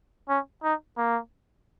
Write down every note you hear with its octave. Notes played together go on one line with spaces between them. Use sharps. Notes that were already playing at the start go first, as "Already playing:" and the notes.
C#4
D#4
A#3